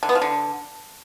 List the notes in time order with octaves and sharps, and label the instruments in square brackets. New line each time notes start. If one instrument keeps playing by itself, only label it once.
[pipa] D3
B3
F3
D3